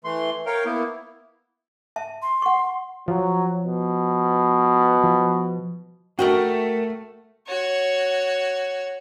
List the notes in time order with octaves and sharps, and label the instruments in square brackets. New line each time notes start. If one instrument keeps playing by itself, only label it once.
[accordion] E3 A3 C6
A#4 C#5 F5 G5
A#3 B3 E4
[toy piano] E5 A5
[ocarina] C6
[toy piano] F#5 C#6
[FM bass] F3 [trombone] F#3
[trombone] B2
[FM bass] F3
[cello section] A3 [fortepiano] F#4 [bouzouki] A#4 F#5 G5
[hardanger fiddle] F#4 C#5